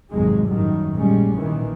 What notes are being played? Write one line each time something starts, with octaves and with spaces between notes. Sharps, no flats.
G#1 F2 C3 D#3 F#3 G#3
F#2 A2 D#3 F#3 G3
A#1 A#2 G3 G#3 C#4
A#1 A#2 D#3 E3